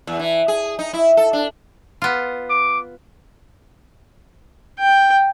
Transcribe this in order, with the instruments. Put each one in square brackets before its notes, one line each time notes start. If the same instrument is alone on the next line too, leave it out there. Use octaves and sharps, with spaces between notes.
[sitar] E2
E3
G#4
D#4
E4
A4
D4
[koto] B3 F4
[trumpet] D6
[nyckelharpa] G5